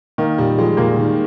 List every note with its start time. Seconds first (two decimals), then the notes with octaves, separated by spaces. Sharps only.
0.18 D#3 A#3
0.38 A#2 G3
0.58 F3 G#3
0.77 A#2 A#3
0.98 D#3